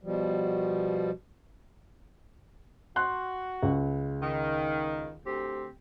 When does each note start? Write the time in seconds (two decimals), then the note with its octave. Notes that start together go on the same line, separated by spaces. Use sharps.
0.03 B2 F3 G3
2.96 F#4 C6 F#6
3.63 C#2
4.23 D#3
5.24 D2 C4 G4